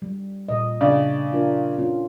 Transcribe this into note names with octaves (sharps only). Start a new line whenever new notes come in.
G3
A#2 D#5
C#3 D4 D5
D4 F4 A#4
C#4 F4